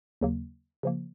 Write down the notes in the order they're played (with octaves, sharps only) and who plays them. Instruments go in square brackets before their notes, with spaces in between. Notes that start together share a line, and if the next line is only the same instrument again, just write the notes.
[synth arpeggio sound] D#2 C#3 F#3 A#3
C#3 F3 A#3